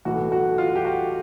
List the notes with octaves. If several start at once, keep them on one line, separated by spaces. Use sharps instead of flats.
B1 A2 E3 F#4
F#4
F4
G4
F#4